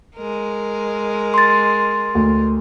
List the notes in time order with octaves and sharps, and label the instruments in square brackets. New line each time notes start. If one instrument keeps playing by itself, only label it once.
[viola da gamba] G#3 A#4
[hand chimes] C6 A6
[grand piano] D2